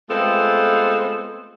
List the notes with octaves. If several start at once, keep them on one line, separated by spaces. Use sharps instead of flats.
G#3 A3 B3 C4 F4 A4